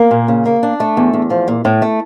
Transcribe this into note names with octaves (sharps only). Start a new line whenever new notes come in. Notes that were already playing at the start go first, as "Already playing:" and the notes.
Already playing: A#3
A#2
C#3
A#3
D4
A3
E2
E2
F3
A#2
A2
A3